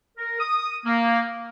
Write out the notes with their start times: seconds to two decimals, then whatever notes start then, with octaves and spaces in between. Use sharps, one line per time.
0.17 A#4
0.39 D#6
0.85 A#3